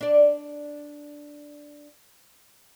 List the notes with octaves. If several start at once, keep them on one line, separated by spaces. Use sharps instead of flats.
D4 D5